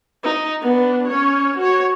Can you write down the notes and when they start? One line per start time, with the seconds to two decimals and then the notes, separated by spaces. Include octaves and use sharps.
0.24 D#4
0.62 B3 D4
1.08 C#4 C#5
1.57 F#4 C#5